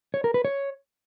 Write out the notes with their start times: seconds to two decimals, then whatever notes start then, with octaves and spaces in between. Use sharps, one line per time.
0.14 C#5
0.24 A#4
0.34 B4
0.45 C#5